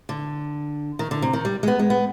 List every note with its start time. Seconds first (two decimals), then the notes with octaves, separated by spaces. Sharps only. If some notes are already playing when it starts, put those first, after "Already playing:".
0.09 D3
0.99 D#3
1.11 D3
1.22 C3
1.33 D#3
1.45 G3
1.63 G#3
1.68 B3
1.79 G#3
1.90 B3